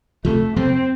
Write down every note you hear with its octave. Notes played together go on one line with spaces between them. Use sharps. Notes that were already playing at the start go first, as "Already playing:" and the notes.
F2 C3 F3 A3
F2 C3 F3 C4